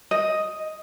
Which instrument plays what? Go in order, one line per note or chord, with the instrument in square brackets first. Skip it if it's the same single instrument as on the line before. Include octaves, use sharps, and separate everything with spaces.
[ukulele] D#5